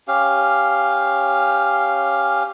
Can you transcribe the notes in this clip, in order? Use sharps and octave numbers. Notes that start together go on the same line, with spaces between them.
C#4 G4 F5